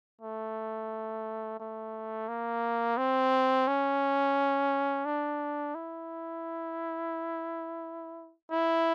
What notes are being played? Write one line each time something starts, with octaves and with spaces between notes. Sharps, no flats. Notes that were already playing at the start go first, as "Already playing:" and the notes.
A3
A3
A#3
C4
C#4
D4
E4
E4